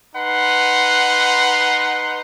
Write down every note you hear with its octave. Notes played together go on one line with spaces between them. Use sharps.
D#4 B4 F#5 C6